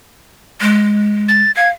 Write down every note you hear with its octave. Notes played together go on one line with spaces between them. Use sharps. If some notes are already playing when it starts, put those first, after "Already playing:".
G#3
A6
F5 G#6